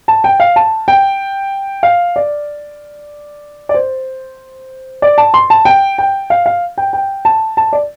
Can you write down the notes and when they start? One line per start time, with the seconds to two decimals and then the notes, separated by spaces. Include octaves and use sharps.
0.08 A5
0.24 G5
0.40 F5
0.56 A5
0.88 G5
1.83 F5
2.16 D5
3.69 D5
3.74 C5
5.02 D5
5.18 A5
5.34 C6
5.50 A5
5.65 G5
5.98 G5
6.30 F5
6.46 F5
6.78 G5
6.93 G5
7.25 A5
7.57 A5
7.73 D5